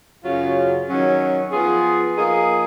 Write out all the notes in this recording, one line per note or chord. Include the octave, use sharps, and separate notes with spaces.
F#2 C#3 F#3 C#4 F4
D#3 F#3 C#4
F3 B3 F4 G#4
F3 A#3 D#4 G#4